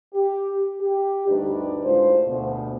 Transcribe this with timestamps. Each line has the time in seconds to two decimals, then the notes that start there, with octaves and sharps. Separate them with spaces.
0.14 G4
0.80 G4
1.28 D2 G2 D4 D#4 B4 D5
1.84 A2 G#3 F4 C5
2.27 D2 B2